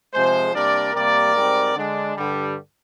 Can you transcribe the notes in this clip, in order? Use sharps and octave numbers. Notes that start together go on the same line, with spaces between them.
C3 F3 G#3 G#4 C5
C3 G3 A#3 D4 A#4 D5
C3 G3 A#3 A#4 D5
G#2 G3 C4
D3 G#3 D4
G2 D3 G3